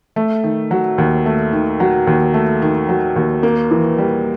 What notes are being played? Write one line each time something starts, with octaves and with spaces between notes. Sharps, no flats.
A3
D#3
F#3
D#2
A3
D#3
F#3
D#2
A3
D#3
F#3
D#2
A#3
E3
G3